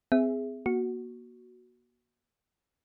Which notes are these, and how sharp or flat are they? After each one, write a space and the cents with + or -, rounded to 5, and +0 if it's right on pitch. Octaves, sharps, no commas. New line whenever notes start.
C4 -35 G#4 +0 E5 +0
A#3 +35 F#4 +0